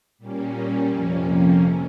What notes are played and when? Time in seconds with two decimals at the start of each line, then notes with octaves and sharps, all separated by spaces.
0.18 A#2 G3 A#3 C#4
0.90 F2 C3 F3 A#3 C#4